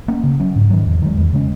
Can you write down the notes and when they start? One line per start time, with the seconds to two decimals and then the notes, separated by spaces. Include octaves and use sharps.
0.08 A#3 C#4
0.23 C#3
0.40 F#3 C#4
0.55 G#2
0.70 D#3 F#3
0.86 E2
1.02 D#3 G#3
1.17 E2
1.33 C#3 G#3 C#4